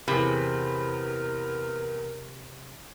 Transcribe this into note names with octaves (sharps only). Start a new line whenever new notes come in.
E2 C3 G#4 A#4 B5